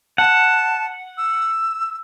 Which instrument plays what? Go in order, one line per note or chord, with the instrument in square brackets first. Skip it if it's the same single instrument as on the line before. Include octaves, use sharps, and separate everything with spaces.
[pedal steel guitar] F#5 [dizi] A5
[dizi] E6